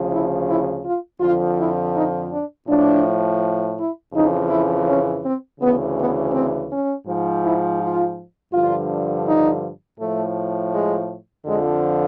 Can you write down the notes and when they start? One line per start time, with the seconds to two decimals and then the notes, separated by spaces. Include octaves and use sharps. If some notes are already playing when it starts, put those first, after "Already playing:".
Already playing: D2 C#3 F3
0.11 E4
0.48 E4
0.84 F4
1.20 F2 D3 F3 F4
1.57 E4
1.94 D#4
2.31 D4
2.67 A2 F3 D4
3.77 E4
4.13 F2 C#3 E3 D#4
4.49 E4
4.87 C#4
5.23 C4
5.60 D2 C#3 E3 B3
5.97 B3
6.32 C4
6.69 C#4
7.07 G#2 F3
7.42 E4
7.80 F4
8.52 G2 D3 F3 F4
9.26 D#4
9.99 A2 F3 A3
10.73 G#3
11.46 F2 D3 F3 G#3